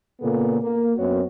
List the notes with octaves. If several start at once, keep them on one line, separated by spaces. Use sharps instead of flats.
A#2 C#3 A#3 B3 A4
A#3
F#2 B3 C4 F#4 C#5